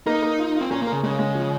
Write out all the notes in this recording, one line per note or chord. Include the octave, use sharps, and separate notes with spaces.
A#3 D#4
A#3
F4
F4
C4
A#2 C#4
A#3
A#4
C#3
C#3 G#3
G#3
F3